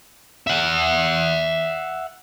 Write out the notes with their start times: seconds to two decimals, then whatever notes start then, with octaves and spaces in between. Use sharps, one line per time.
0.47 E5 F#5